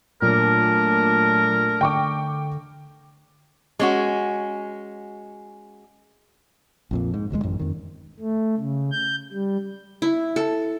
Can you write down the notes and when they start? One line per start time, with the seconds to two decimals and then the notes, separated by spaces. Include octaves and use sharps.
0.22 A#2 F#3 A3 D4 A#4
1.81 D3 G5 C#6 D6
3.79 G#3 C#4 F#4
6.91 A#1 F2 A#2
7.14 G#2
7.30 F#1 D#2 A2 G#3
7.43 A1 F#2
7.59 F2 D#3
8.20 A3
8.57 C#3
8.92 G6
9.32 G3
10.02 E4
10.36 A4